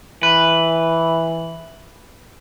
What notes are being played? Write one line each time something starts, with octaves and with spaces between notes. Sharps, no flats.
E3 B4